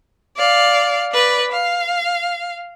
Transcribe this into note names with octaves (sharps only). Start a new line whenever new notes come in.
D5 F5
B4 D5
F5